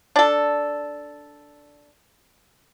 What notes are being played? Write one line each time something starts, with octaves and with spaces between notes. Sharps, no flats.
D4 A4